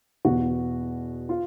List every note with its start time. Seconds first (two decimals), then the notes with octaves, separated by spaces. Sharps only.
0.25 E2 B2 F#4
1.29 F4